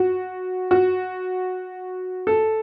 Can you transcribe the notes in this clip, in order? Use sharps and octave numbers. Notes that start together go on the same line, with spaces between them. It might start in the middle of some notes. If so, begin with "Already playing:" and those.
Already playing: F#4
F#4
A4